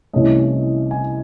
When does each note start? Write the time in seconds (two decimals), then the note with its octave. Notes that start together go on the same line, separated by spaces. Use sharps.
0.13 C2 C3 E3 A3 C#4 D#5
0.91 G#5